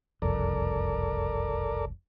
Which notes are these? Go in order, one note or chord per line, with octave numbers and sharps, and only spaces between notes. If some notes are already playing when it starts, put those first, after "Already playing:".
F#1 C2 F2 A4 A#4 D5